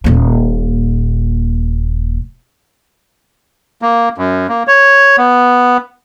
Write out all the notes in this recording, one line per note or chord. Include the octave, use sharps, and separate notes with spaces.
D#1 A#2
A#3
F#2
A#3
C#5
B3